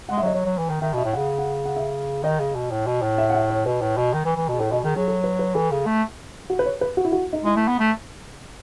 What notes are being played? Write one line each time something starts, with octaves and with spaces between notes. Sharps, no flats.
G#3 F#5
E5
F#3 D#5
F#3 C#5
F#3
E3
D#3
D#3 E5
B2 E5
A2
C#3 F#5
F#5
F#5
E5
D#3 D#5
C#3
B2
A2
B2
A2
E5
F#5
E5
C#5
B2 B4
A2
B2
D#3
E3
E3
B2 G#4
A2 A4
B2 D#5
D#3 G#4
F#3 G#4
A4
B4
B4
E3 A4
C#3
A3
F#4
B4
C#5
B4
F#4
E4
F#4
D#4
G#3 E4
A3
B3
A3